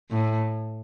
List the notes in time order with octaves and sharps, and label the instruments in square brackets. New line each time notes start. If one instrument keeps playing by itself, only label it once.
[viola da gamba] A2